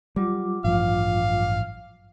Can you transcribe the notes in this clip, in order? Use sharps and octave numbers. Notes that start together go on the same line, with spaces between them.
F#3 G3 F4 D6
A1 G2 F3 F5